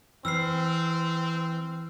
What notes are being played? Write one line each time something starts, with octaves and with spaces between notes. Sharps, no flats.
E3 C4 E6 F6 C7